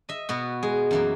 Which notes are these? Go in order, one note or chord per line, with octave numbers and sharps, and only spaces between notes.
D#5 E5
B2 B3 F#4
G#3 G#4
F#2 E3 A#3